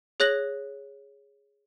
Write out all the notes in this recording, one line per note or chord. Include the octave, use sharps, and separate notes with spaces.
G#4 C#5 F#6 A#6 F#7